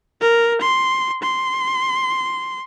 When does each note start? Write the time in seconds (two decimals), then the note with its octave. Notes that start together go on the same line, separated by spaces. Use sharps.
0.21 A#4
0.61 C6
1.23 C6